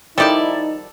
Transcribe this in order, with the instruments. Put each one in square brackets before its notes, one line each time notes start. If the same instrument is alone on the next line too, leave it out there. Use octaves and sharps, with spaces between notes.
[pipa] D#3 F3 G3 [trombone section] D#4 [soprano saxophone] E4 [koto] A4 D5 A5